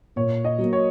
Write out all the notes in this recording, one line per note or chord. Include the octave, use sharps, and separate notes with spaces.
A#2 C#5
D#5
F#3 A#3
C#5